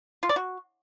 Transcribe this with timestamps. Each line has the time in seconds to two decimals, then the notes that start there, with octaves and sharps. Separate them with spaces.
0.23 F4
0.29 D5
0.36 F#4